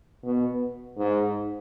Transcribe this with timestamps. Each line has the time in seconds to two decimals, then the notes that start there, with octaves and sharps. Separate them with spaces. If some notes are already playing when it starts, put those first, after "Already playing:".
0.24 B2
0.97 G#2